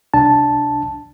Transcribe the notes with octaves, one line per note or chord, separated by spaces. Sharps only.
C2 D4 A5